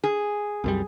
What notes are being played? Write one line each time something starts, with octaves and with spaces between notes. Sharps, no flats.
G#4
C2 F#2 G3